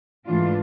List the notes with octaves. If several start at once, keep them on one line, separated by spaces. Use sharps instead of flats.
G#2 E3 A3 D4 F4